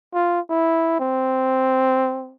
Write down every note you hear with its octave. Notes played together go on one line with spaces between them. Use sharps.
F4
E4
C4